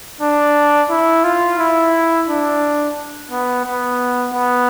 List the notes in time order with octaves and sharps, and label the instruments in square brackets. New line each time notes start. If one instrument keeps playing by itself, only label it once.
[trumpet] D4
E4
F4
E4
D4
B3
B3
B3